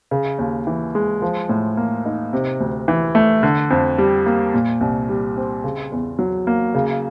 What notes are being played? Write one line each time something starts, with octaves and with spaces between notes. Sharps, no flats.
C#3
D#2
E3
G#3
F3
A2
A#3
D#4
C3
D2
E3
A3
D3
F2
G3
A#3
A#2
C2
G3
C4
C#3
E2
F#3
A#3
C#3